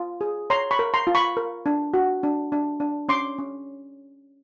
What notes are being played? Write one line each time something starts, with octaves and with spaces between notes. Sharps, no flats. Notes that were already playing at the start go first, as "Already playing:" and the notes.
Already playing: F4
G#4
C#5 A#5 C6
B5 C#6
A#4
A#5 C6
F4
B5 C#6
A#4
D4
F#4
D4
D4
D4
C#4 C6 D6
C#4